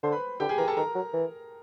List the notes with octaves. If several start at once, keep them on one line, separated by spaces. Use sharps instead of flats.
D3 C5 C6
B4 B5
D3 G4 G5
G#4 G#5
E3 A#4 A#5
A4 A5
D#3 A#4 A#5
F#3
E3